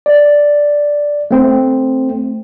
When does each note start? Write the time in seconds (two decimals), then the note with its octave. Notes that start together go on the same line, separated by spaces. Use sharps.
0.06 D5
1.31 A3 C4